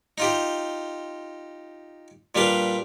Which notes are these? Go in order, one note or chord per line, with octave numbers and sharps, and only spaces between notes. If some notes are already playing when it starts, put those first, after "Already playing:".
D#4 F4 G4
A#2 G3 D4 B4 F5